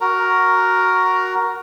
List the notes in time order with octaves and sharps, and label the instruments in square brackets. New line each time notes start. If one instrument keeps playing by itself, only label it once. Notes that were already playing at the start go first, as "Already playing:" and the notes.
[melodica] F#4 A#4 A#5